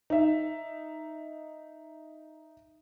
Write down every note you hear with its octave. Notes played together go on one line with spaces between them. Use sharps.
D#4 E5